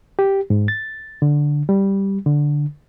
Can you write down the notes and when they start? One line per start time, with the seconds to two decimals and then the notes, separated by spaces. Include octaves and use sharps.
0.19 G4
0.50 G#2
0.68 A6
1.22 D3
1.69 G3
2.26 D3